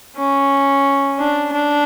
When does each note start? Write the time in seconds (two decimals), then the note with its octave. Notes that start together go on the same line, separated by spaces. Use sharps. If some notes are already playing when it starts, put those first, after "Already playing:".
0.17 C#4
1.19 D4
1.53 D4